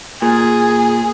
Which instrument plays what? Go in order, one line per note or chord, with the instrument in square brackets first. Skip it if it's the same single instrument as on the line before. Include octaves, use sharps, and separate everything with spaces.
[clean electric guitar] A#2 [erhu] G#4